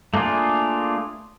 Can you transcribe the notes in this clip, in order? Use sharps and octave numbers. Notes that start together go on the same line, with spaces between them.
A3 A#3 D4 F4 G#4